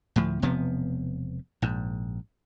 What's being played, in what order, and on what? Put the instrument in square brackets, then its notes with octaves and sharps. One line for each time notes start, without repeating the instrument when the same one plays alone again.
[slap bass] D2 A2 F3
E1 C3 F3 B3
A#1 G#2